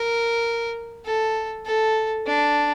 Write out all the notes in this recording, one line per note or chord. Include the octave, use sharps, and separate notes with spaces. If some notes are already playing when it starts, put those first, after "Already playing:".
Already playing: A#4
A4
A4
D4